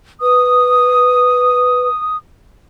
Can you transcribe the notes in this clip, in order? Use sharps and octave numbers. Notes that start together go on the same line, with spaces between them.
B4 D#6